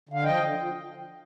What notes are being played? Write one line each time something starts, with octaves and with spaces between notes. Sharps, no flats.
D3 F5
F3 D#5 G5
D3
F3